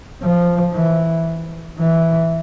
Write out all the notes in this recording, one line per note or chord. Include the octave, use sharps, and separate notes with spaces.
F3
E3
E3